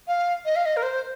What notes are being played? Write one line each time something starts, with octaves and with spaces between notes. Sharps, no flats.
F5
D#5
F5
D#5
A#4
C5